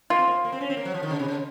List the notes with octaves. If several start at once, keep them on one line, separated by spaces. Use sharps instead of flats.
A#3 F4
C4
A#3
A#3
C4
C#4
C4
A#3
F#3
F3
D#3
C#3
C3
C#3